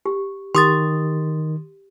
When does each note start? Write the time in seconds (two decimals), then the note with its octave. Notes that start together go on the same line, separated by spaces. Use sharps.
0.06 G4
0.55 D#3 G4 C6 D#6 A6